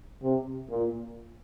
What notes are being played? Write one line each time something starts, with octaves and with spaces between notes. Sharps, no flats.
C3
A#2